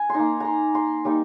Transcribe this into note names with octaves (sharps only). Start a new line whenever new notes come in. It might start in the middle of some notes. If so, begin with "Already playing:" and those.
Already playing: G#5
C6
A#3 D#4 A#5
A#5 C6
C6
G3 A#3 D#4